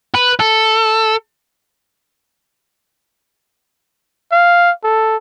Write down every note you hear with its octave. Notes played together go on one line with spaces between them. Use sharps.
B4
A4
F5
A4